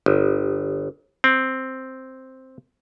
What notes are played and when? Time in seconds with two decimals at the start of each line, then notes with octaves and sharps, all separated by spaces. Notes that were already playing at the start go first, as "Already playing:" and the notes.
0.06 G1
1.24 C4